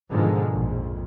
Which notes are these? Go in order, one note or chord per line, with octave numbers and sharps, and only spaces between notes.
G#2 B2 D3 D#3 F3 G#3
A#1 F2